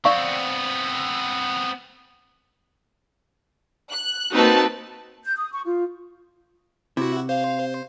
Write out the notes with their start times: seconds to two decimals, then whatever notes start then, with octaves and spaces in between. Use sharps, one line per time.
0.05 B3 C4 D5 F5 C#6
3.90 F#6
4.34 A#3 C4 D#4 F#4 B4 A5
5.25 G6
5.36 D#6
5.53 C#6
5.65 F4
6.97 C3 E4 F#4
7.29 C5 F5